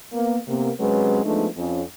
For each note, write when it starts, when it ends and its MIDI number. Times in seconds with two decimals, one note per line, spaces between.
0.13 0.37 58
0.13 0.37 59
0.48 0.71 48
0.48 0.71 58
0.48 0.71 59
0.79 1.20 48
0.79 1.20 54
0.79 1.20 56
0.79 1.20 60
0.79 1.20 61
0.79 1.20 71
1.24 1.46 53
1.24 1.46 56
1.24 1.46 57
1.24 1.46 59
1.24 1.46 62
1.24 1.46 63
1.56 1.82 41
1.56 1.82 61